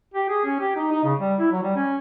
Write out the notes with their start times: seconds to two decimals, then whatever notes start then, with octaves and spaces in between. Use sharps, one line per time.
0.14 G4
0.29 G#4
0.45 C#4
0.60 G4
0.76 D#4
0.91 D#4
1.04 C#3
1.19 G3
1.39 E4
1.52 F#3
1.63 G3
1.76 C#4